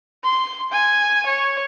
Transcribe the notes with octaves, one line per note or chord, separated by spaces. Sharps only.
C6
G#5
C#5